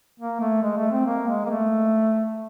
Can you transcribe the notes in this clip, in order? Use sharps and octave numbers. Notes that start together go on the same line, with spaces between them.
A#3
A3
G#3
A3
C4
A#3
G#3
A#3
A3